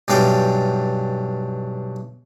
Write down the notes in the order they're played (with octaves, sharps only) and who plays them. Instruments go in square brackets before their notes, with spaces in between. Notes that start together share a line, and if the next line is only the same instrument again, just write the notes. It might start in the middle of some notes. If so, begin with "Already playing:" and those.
[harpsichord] B1 G2 E3 G3 F5 G5